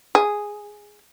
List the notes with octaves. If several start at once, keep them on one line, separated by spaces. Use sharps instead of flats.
G#4